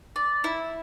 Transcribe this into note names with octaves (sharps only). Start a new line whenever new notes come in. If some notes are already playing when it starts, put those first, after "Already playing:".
D5
E4